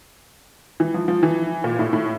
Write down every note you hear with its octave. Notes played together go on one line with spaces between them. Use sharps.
E3
F3
F3
E3
A#2
A2
A2